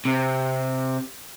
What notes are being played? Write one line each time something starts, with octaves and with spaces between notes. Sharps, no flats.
C3